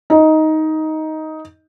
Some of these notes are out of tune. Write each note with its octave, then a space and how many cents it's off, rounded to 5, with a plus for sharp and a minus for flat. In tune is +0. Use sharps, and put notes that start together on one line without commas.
D#4 +10